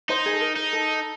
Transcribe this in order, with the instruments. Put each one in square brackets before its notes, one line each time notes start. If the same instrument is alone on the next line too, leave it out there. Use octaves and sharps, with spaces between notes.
[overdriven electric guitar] D#4 [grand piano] C5
[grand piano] G#4
A4
A#4
[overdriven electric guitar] D#4
[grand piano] A4